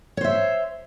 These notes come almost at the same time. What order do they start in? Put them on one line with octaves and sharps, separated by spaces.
C#5 C5 E5